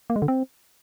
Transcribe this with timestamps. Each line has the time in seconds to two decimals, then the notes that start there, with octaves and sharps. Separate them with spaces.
0.10 A#3
0.16 G#3
0.22 D3
0.28 C4